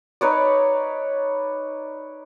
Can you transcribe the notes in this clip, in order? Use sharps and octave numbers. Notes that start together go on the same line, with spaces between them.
D#4 B4 C#5 D5